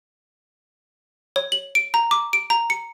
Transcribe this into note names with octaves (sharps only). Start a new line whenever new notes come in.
C#5
F#7
D7
A#5
D6
D7
A#5
C#7